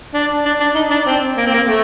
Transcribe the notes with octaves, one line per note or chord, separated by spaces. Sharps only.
D4
D4
D4
D#4
D4
C4
A#3
C4
A#3
A3